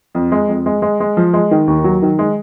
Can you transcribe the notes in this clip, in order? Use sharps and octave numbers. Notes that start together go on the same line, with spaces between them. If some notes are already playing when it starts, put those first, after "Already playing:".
F2
G#3
F2
G#3
G#3
G#3
F3
G#3
D#3
D#2
F#3
D#3
G#3